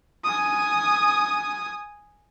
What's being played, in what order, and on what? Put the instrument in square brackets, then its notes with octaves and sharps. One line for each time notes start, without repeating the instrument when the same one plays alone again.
[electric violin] G#5 D#6